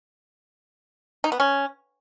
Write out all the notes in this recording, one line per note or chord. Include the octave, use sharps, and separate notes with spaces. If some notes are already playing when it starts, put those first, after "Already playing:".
D#4
B3
C#4